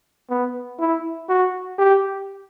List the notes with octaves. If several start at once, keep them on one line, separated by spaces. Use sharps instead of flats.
B3
E4
F#4
G4